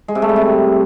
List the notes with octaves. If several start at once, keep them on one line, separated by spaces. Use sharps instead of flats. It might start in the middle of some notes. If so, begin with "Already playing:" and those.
G#3
C3
A3
G3
C3